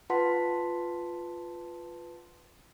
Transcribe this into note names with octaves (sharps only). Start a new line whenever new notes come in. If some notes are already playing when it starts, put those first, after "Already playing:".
F4 B4 F#5 A5 C6 B6